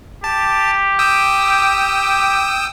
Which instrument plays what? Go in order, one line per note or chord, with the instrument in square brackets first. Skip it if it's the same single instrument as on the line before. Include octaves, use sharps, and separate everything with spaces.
[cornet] G4 [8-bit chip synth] A5
[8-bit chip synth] G5 D#6 E6